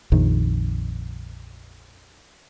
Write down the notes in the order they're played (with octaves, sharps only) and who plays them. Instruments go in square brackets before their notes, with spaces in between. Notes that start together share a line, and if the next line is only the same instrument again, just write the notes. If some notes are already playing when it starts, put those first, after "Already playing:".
[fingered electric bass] A#1 F2 D#3